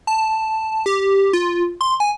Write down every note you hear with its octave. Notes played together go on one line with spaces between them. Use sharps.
A5
G4
F4
C6
G#5